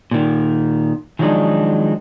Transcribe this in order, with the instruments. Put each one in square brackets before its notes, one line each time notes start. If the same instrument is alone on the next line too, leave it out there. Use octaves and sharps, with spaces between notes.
[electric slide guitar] A#2 D#3
D#3 F3 F#3 G#3 D4 D#4